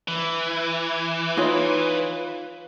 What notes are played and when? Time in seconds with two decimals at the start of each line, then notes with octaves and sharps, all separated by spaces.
0.08 E3
1.37 D#4 F4 C#5